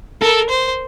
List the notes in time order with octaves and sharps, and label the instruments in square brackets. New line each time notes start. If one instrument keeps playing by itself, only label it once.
[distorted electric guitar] A4 [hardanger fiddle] A#4
[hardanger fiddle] C5